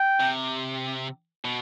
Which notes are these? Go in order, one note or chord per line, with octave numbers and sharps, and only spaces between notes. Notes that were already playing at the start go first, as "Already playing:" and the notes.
Already playing: G5
C3
B2